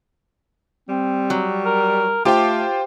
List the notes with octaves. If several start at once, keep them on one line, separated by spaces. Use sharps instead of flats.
G3 C4
F#3
A#4
A3 F4 G4 C5 F5 G5